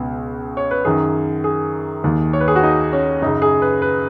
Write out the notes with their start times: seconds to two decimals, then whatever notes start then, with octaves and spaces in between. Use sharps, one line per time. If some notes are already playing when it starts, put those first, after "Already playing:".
Already playing: C#2 B2
0.57 C#5
0.71 B4
0.85 F#2 D#3 G#4
1.44 G#4
2.04 D#2 D#3
2.33 C#5
2.40 B4
2.48 G#4
2.56 F#4
2.63 D#4
2.93 C#4
3.22 F#2 C#3 D#4
3.42 G#4
3.62 B4
3.82 B4